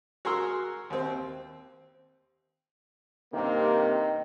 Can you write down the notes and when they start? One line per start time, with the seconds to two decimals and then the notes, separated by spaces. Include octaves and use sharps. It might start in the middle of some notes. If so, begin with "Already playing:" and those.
0.25 F#4 G#4 A#4 C6 E6 F6
0.90 D#2 C4
3.34 G2 C3 D#3 A#3